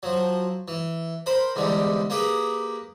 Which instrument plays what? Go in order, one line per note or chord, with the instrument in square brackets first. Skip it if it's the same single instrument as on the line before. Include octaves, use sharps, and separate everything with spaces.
[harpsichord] F3 F#3
E3
A#4 C5 B5
E2 G#2 D3 G3
A#3 G4 G#4 B4